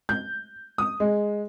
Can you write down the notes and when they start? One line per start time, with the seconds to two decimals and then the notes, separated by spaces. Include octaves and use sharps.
0.09 G6
0.78 D#6
1.00 G#3